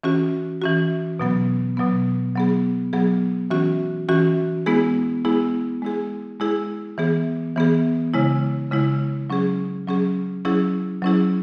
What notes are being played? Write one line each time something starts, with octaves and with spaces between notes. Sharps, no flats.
E3 C#4 F#4
E3 C#4 F#4
B2 F#3 B3
B2 F#3 B3
F#3 B3 G#4
F#3 B3 G#4
E3 C#4 F#4
E3 C#4 F#4
G#3 B3 E4 G#4
G#3 B3 E4 G#4
G#3 E4 G#4
G#3 E4 G#4
E3 B3 G#4
E3 B3 G#4
C#3 G#3 E4
C#3 G#3 E4
F#3 C#4 G#4
F#3 C#4 G#4
F#3 C#4 E4 G#4
F#3 C#4 E4 G#4